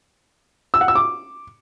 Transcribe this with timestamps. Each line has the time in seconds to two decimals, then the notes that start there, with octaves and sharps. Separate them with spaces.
0.74 E6
0.81 F#5
0.88 E6
0.95 D6